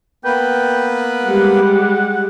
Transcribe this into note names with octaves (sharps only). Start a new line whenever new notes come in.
A#3 B3 B4 G5
G3 G#3 G4 F#5